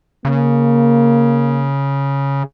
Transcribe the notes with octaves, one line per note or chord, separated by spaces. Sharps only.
C#3 A#3